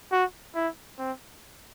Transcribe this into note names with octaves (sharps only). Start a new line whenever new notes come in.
F#4
E4
C4